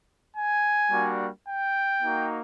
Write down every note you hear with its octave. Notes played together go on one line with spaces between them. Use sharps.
G#5
G3 A#3 D4 F#4
G5
A#3 D#4 F#4